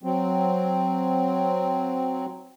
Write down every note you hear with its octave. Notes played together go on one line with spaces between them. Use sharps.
F#3 C4